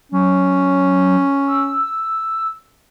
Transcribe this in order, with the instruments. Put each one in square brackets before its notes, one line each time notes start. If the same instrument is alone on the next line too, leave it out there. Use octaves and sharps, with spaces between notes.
[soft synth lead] F#3 [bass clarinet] C#4
[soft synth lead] E6